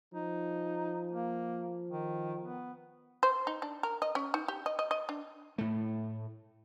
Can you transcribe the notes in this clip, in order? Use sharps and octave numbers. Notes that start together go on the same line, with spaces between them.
F3 D#4
A#3
D#3
B3
C5
D#4
D4
A#4
D#5
C#4
D#4
G4
D#5
D#5
D#5
D4
A2 A3